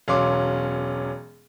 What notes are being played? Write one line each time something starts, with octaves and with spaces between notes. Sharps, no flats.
E1 F#3 C#4 F5 C6 D6